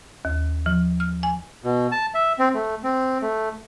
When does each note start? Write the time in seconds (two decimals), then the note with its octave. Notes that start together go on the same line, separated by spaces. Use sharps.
0.25 D#2
0.66 F3
1.00 F6
1.23 G#5
1.64 B2
1.92 A5
2.14 E5
2.39 C4
2.54 A3
2.83 C4
3.22 A3